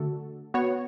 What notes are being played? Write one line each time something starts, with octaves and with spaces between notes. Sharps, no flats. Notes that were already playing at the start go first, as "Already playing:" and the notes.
Already playing: D3 A3 D4 F#4 A4
B3 F#4 C#5